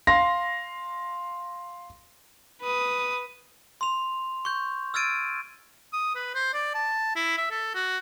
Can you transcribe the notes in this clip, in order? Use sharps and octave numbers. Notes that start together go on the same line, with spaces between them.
F5 C6 A#6
B4 D#6
C6 F7
C#6 G6
E6 F6 G#6 A6 D7 D#7
D#6
B4
C5
D5
A5
E4
E5
A4
F#4